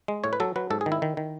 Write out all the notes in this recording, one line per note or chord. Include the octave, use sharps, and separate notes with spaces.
G#3
A2 C#5
B4
F#3 A4
F#3 B4
G#2 A4
G#4
D#3
E4
D#3
D#3